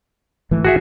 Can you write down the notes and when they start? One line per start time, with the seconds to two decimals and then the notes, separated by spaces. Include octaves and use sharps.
0.51 G#1 E3 A3
0.65 F#4 G#4 E5